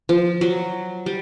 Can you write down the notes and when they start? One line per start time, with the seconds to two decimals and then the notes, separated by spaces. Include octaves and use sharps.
0.09 F3
0.41 F#3
1.06 G3